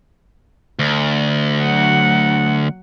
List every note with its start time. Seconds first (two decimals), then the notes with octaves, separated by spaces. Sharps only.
0.79 D2
1.60 F#3 F#5